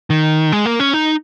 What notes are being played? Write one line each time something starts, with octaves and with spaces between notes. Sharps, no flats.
D#3
G#3
A#3
C#4
D#4